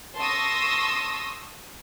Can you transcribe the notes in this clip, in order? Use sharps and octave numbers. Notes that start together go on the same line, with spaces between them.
A5 C6 C#6 D#6 E6 A#6